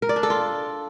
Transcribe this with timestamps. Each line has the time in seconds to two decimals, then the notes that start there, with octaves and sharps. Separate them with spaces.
0.02 A#4
0.09 D5
0.16 D4
0.23 A4
0.30 F4